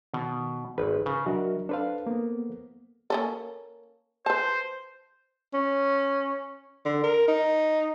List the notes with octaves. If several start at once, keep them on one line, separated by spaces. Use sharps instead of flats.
B2 D#3
G#1 B4
C#3
F#3 D4 F#4 A#4 D#5 E5
D4 A4 B4 C5 F5
A#3 B3
A#3 C#4 A4
B4 C5 A5
C#4
D3
A#4
D#4